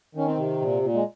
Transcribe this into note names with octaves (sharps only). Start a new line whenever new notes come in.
D#3 C#4
C4
C3
A#2
A#2
G#3